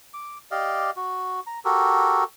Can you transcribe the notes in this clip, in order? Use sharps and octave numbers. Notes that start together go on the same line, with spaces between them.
D6
G4 D5 D#5 F5
F#4
A#5
F#4 G4 A4 A#4